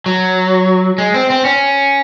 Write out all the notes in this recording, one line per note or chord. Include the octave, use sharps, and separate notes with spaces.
F#3
G#3
C4
C4
C#4